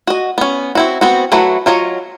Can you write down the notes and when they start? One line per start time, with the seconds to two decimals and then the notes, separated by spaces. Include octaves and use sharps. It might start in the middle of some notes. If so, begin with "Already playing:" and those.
0.07 F#4 D#5
0.38 B3 C#4
0.75 C4 E4 F#4
1.01 B3 C4 F#4
1.32 F#3 A3 E4 F#4 B4
1.66 F#3 F4 C#5 D#5